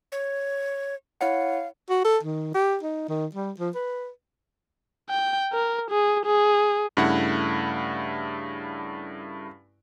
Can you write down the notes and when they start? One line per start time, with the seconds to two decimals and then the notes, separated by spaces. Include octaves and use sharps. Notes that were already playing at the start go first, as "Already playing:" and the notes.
0.12 C#5
1.21 E4 C#5 F5 F#5
1.90 F#4
2.05 A4
2.24 D#3
2.55 G4
2.83 D#4
3.09 D#3
3.35 G3
3.59 F3
3.75 B4
5.10 G5
5.53 A#4
5.91 G#4
6.25 G#4
6.97 G2 C#3 A3 E4 F#5